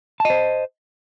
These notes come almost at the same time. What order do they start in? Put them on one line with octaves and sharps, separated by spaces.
A5 D#5 C5